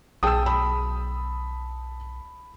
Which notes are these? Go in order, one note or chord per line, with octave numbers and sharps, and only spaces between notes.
B1 G#4 G5 A5 D#6 E6
A5 B5